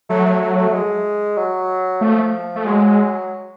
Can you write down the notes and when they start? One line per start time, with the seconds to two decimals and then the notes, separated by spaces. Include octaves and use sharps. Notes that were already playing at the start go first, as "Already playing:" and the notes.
0.09 F#3 A3
0.26 A3
0.42 A3
0.58 A3
0.73 G#3
1.37 F#3
2.01 F3 A3
2.55 A3
2.65 F#3 G#3